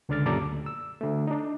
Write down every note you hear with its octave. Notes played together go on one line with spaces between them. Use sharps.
C#2 D3 D5 F6 A6
F#2 A#2 G4 A4 D5 A#5
D2
E6
D3 A3
D4 D#4